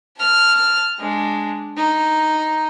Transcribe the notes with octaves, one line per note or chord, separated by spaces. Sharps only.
A5 F6
G#3 D4
D#4